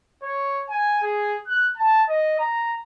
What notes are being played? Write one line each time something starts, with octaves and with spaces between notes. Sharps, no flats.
C#5
G#5
G#4
F#6
A5
D#5
A#5